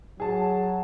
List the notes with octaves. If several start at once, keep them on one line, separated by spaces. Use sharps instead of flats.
F#3 G#4 A5